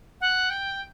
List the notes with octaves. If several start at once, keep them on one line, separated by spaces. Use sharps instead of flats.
F#5
G5